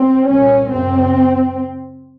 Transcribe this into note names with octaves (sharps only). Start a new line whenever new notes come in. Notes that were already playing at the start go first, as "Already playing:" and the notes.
Already playing: C4
C2 A#2 C#4
F#2 C#3 C4